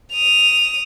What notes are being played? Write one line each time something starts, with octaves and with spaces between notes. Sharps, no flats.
D#6 F7